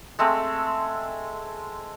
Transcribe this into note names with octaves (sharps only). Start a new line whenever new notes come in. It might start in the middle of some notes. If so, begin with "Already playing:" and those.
G#3 A3 C4